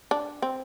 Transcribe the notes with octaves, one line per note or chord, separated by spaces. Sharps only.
D4
C4